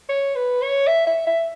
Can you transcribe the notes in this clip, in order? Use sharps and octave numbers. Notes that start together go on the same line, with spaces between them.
C#5
B4
C#5
E5
E5
E5